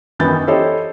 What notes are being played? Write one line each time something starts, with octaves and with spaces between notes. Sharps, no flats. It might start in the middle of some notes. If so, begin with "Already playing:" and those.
F#2 D#3 E3 B3 G6 A6
E4 G4 A4 C5 C#5 D#5